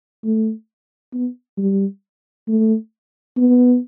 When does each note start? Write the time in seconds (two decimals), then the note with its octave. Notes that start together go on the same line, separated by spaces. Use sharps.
0.24 A3
1.13 B3
1.58 G3
2.48 A3
3.37 B3